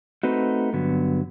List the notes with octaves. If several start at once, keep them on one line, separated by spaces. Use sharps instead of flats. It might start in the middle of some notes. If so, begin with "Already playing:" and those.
A3 C4 D#4 F#4 B4
G2 D3 F#3 B3